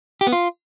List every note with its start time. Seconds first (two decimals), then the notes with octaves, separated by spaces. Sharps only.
0.21 G4
0.27 B3
0.32 F4